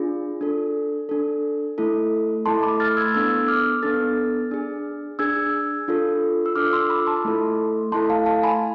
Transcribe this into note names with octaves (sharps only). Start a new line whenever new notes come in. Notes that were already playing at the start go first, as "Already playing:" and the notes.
Already playing: D4 F4 G#4
D4 A4
D4 A4
A3 E4 A4
A3 E4 A4 A5 C6
B5 D6
F6 A6
E6 G#6
B3 D4 A4 E6 G#6
D6 F6
B3 D4 A4 F6 A6
D4 G#4
D4 G#4 E6 G#6
D4 F4 A4
E6
D4 F4 A4 D6 F6
C6 E6
B5 D6
A5 C6
A3 E4 A4
A3 E4 A4 A5 C6
F5 A5
F5 A5
G#5 B5